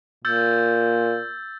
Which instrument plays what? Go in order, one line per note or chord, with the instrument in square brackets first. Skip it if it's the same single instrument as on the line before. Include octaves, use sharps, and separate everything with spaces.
[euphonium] A#2 [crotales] E6 G6 A6